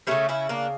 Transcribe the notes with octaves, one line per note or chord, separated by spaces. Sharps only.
C#3 G3 A3 C#4
C#4 E4
A#3 D4